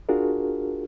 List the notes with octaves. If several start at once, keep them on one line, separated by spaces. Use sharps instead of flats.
D4 F4 F#4 G#4 A#4